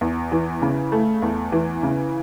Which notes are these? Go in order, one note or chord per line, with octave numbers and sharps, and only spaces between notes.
E2
E3
C#3
A3
E2
E3
C#3